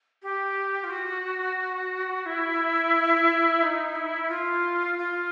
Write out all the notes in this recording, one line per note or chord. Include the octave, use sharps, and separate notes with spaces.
G4
F4
F#4
E4
D#4
E4
F4
F4